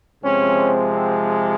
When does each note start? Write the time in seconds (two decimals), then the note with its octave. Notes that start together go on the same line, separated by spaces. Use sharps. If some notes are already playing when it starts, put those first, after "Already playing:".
0.23 C3 F3 G#3 C4 C#4
0.95 C4